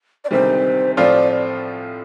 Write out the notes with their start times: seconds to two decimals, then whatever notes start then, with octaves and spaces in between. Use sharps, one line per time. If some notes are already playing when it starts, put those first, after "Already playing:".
0.24 D5
0.31 D2 C3 D#3 G3 C5
0.97 A2 F3 C4 F4 D5